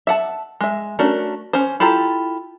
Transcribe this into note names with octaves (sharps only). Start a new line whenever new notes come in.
E5 F#5 A5
G#3 E5
A3 C#4 D4 F#4 A#4
C#4 C5
E4 F4 G4 A4 A#5